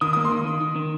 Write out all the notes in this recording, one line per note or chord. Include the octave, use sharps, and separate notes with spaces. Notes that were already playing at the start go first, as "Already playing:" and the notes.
D#3 D#6
D#6
A#3
C6
D#3
D#3
D#3
D#3